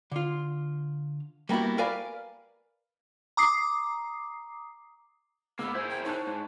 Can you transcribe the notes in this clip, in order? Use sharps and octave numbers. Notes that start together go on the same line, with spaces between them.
D3 F4
G3 A#3 B3 E4 F#4
A#4 B4 D5 F5 G#5 B5
A#5 D6 D#6 C7
G#2 A#3 B3 D6 E6
E4 G#4 A#4 C5 G6
G5
D#4 C#5 A5 F#6
G#2